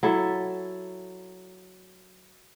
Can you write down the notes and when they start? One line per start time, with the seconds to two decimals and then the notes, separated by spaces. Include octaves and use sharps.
0.03 F#3 E4 A4 E5